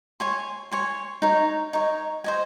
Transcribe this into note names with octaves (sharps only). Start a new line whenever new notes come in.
C#5 G#5 C6
C#5 G#5 C6
D#4 A#4 C#5
D#4 A#4 C#5
C5 D#5 G#5